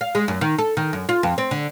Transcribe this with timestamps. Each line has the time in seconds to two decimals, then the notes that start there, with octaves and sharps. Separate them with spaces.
0.01 F5
0.15 G#3
0.28 F#2
0.41 D#3
0.58 A4
0.77 D#3
0.93 F#2
1.09 F4
1.23 F2
1.38 C4
1.51 D3